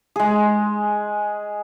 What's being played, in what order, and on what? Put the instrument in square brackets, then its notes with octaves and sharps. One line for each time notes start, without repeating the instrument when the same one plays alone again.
[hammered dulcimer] G#3 G#4